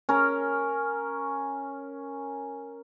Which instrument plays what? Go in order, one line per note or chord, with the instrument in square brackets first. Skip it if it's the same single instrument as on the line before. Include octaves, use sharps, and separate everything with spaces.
[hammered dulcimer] C#4 A#4